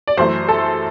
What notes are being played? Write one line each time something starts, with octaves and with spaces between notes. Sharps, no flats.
D5
F#2 E3 A3 C5
A4